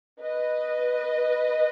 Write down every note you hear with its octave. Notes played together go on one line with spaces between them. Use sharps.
B4 D#5